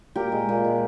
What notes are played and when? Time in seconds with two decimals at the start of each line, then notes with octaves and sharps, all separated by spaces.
0.15 A#2 G4 A#4
0.32 G#3
0.49 A#2
0.64 G#3